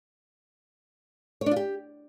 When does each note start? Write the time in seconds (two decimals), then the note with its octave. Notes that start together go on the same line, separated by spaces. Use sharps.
1.41 C#5
1.46 D4
1.51 F4
1.56 G4